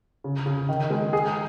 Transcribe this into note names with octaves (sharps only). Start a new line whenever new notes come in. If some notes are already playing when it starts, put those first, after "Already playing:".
C#3
C#3
D#3
G#3
G#4